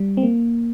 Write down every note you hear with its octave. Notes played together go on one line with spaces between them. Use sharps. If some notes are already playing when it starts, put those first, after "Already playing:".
Already playing: G3
C4
A#3